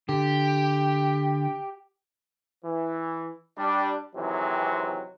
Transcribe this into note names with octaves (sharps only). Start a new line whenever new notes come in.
D3 G4
E3
G3 D4
C3 D#3 E3 F#3 G#3 C4